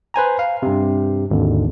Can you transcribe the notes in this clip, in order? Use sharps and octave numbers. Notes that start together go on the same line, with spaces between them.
B4 C5 G#5 A#5
F5
G2 C3
G#1 D#2 D3